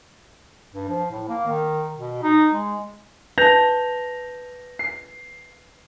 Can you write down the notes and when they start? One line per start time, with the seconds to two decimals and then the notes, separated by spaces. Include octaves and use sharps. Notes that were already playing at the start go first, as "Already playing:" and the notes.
0.74 G2
0.89 F3
1.11 A2
1.28 A#3
1.47 D#3
1.96 B2
2.23 D#4
2.53 G#3
3.38 B4 A5 G6 A#6 F7
4.79 C7